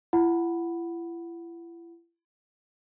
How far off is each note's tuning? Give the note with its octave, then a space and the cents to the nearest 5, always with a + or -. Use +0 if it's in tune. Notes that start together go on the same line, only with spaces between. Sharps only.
E4 +40 F#5 +0 B5 +0